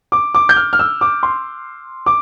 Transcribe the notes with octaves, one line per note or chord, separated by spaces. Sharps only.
D6
D6
G6
F6
F6
E6
D6
C6
D6